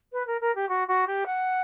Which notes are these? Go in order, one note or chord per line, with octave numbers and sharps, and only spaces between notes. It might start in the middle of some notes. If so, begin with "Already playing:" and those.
B4
A#4
A#4
G4
F#4
F#4
G4
F#5